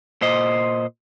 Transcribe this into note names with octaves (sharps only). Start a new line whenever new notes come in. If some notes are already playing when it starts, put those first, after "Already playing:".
A#2 C5 D#5